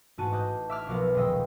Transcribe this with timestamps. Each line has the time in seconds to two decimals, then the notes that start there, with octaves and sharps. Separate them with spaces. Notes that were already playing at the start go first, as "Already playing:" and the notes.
0.18 A1 G#2 F#4 A5 D#7
0.32 D#5 D6 F#6 G6
0.70 E5 D6 F6 G#6
0.87 B1 F3 B3 A#4 D6
1.15 D#1 F3 G3 D#5 G5 E6